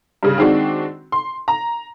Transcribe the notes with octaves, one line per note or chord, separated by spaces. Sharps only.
G2 C#3
D#3 G#3 C4 D4 F#4
C6
A#5